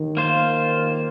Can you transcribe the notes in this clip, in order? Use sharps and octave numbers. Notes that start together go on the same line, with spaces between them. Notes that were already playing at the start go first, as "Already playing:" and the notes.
Already playing: D#3
A#3 F4 C5